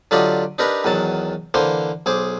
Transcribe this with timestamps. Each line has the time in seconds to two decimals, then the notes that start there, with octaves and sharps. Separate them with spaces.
0.11 D3 F#3 F4 G4 D5 D#5
0.58 D4 D#4 G4 A#4 B4 A#5
0.84 E2 D#3 F#3 A5
1.54 D3 E3 A#3 C5 C6
2.06 B1 G#4 C5 D6